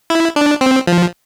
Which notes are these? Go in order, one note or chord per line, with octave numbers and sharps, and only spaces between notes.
E4
D4
C4
F3